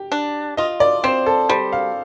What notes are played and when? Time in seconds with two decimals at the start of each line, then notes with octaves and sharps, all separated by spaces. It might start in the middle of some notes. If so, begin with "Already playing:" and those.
Already playing: G4
0.12 D4
0.57 F4 D#5
0.80 D5
1.04 C4 C5
1.26 A4
1.49 G3 C5
1.73 F5